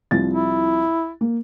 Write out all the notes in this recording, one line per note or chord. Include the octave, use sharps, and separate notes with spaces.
C2 F3 A6
E4
A#3